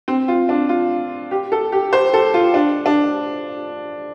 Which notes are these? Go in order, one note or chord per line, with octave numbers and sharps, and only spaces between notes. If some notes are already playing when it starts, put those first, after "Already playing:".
C4
F4
D4
F4
G4
A4
G4
C5
A4
F4
D4
D4